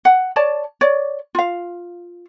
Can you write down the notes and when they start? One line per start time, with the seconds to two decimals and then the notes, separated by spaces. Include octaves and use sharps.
0.05 F#5
0.36 C#5 D5 A5
0.81 C#5 D5
1.35 F4 F5